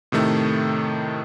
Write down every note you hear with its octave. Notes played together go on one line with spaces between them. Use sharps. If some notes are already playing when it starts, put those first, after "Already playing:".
A2 C3 D#3 A3